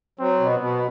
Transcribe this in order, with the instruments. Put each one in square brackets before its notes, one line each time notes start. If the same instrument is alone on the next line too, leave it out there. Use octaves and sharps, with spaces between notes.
[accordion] F#3 [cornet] C4
[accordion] B2
[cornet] B3
[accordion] B2